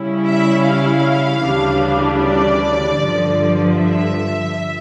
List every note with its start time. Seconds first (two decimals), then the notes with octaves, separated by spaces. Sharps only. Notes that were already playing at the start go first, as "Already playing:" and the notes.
Already playing: C#3 G3 C#4 E4
0.28 E5
0.66 F5
1.43 D2 C#3 E3 G3 D4
2.21 D5
2.98 G2 D3 F3
3.76 E5